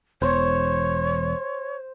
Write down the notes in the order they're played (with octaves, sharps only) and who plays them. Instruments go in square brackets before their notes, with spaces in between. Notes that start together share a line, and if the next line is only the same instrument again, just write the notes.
[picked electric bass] E1 E2 [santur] C5 [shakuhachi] C#5